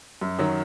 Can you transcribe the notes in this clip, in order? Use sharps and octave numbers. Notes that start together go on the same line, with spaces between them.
F#2
D#3 F#3